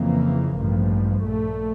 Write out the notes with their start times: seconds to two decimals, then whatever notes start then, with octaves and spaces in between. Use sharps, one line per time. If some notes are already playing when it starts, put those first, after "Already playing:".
Already playing: F2 C#3 E3 A#3
0.56 A1 G2 F3
1.24 A#1 A#2 A3